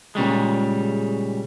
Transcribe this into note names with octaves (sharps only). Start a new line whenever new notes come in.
A#2 C#3 G3 G#3